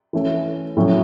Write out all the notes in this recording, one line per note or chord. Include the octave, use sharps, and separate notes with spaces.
E3 A3 C#4
A2 F#3 C#4 E4